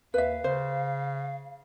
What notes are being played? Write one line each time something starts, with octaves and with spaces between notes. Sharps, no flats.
D#2 B4 E5 F5
C#3 C5